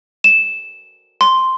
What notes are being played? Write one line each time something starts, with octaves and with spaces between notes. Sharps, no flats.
E7
C6